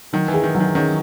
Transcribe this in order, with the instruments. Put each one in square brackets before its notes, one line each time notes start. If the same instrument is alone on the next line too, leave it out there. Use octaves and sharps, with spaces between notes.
[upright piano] D#3 [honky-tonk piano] F#3
[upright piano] E3
[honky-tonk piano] G#4
[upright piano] D#3
[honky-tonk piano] F#3
[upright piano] D#3
[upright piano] D#3 [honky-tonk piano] C#4